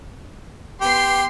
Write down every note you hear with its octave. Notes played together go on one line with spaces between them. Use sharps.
B3 G4 C6 C7